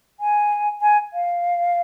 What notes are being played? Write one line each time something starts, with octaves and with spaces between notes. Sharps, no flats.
G#5
G#5
F5